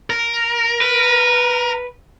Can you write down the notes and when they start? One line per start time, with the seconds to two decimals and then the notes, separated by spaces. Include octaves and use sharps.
0.10 A#4
0.81 B4